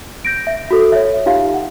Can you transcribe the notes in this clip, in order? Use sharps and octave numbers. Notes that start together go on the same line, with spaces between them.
G6 A#6 D7
E5
F#4 A4
C#5 E5
D#4 F4 G4 F5
F#5